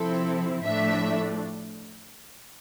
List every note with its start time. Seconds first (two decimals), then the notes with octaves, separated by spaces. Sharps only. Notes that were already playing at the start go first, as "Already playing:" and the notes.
Already playing: C3 F3 C4 E4 A4
0.64 A2 F3 A3 D4 E5